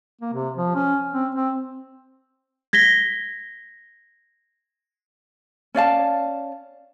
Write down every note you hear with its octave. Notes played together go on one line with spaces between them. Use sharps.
A#3
C3
F3
C#4
C4
C4
G#6 A#6 B6 G7
C#4 D5 F5 A5